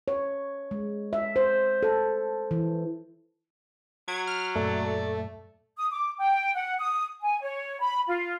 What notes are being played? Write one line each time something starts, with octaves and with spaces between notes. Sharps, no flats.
C#5
G#3
E5
C5
A4
E3
F#3 G#6
F6
F#2 A#2 A3 D5
D#6
D6
G5
F#5
D#6
G#5
C#5
B5
F4